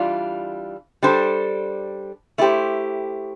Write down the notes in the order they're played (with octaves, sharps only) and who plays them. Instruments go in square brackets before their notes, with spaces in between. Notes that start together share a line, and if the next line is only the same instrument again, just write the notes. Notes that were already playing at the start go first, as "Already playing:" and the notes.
Already playing: [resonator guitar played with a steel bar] E3 G3 D4 F4
G3 D4 A4 C5
A3 E4 G4 C5